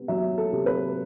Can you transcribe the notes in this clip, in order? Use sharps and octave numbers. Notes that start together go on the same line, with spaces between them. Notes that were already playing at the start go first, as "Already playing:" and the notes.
Already playing: C3 B3
F#3 E5
A4
C3
B4